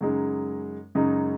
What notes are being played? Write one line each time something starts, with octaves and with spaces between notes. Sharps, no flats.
F#2 C#3 G#3 D#4
F#2 C#3 G#3 D#4